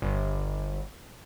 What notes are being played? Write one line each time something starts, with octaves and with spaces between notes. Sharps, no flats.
G1